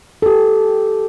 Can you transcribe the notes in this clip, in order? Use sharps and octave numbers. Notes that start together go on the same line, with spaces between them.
G4 A4